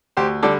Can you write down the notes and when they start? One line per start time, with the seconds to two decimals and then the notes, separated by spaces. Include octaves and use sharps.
0.17 D2 G4 C5
0.43 D3 G3 A4 D5